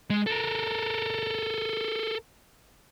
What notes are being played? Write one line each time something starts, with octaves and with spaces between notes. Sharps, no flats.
G#3
A4 A#4